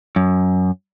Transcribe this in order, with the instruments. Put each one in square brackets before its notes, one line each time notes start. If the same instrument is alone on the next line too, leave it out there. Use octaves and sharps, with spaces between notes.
[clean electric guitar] F#2